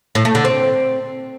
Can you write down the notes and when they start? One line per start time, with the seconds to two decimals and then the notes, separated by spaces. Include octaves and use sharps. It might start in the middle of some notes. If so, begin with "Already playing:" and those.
0.15 A2
0.25 A3
0.35 D3
0.45 C4